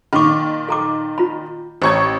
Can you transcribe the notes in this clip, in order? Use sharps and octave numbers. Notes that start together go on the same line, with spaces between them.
A#2 D#3 B5 C#6 D6
A4 A#5 D6
F4 A#5 B5
A1 C5 C#5 A#5 C#6 G#6